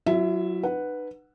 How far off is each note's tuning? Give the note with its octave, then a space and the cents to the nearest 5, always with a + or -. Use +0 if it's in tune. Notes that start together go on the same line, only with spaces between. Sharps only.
F#3 +0 E4 +45 E5 +0
D#4 -40 B4 +0 F#5 +0